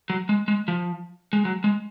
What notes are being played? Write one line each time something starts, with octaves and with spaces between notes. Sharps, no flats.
F#3
G#3
G#3
F3
G#3
F#3
G#3